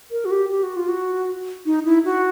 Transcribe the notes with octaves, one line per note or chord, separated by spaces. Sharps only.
A#4
F#4
G4
G4
F#4
F4
F#4
D#4
E4
F#4